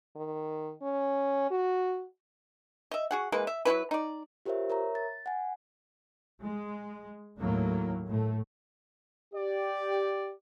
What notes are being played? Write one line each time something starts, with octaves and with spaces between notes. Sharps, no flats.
D#3
C#4
F#4
D#5 E5
F#4 G#4 F#5
E3 G#3 A#3 B4
E5
F#3 C4 E4 B4
D#4 D5
F4 G4 A#4 C5 C#5 E5
A#4 C#5 E5 A#5
A6
F#5 G#5
G#3
D#2 A2 F#3 A#3
A2 A3
G4 D5